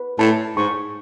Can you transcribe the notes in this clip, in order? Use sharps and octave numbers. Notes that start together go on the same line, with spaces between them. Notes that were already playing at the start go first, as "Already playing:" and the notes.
Already playing: B4
A2 A5
G#2 C#6